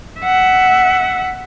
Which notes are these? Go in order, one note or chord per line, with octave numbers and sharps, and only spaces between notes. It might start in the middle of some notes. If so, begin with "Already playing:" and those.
E5 F#5